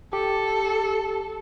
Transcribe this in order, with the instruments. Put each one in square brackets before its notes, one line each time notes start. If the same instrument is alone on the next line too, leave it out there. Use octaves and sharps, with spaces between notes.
[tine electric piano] G4 [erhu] A4